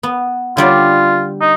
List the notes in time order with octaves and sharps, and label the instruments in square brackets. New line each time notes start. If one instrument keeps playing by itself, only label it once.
[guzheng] B3
[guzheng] D3 G3 D5 [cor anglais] F4
[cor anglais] D#4